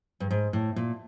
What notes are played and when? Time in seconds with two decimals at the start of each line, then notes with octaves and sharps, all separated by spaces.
0.20 G2
0.31 G#2
0.53 A2
0.76 A#2